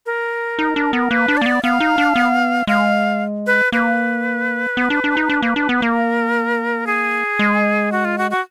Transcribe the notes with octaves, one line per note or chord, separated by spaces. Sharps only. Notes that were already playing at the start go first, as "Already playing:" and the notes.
A#4
D#4
D4
B3
A#3 B4
D4
A#3 D5
B3
B3 F5
D#4
D4
B3
G#3 F5
B4
A#3 B4
B3
D4
D4
D#4
D4
A#3
D4
B3
A#3 A#4
G#4
G#3
F#4
F4
F#4
F#4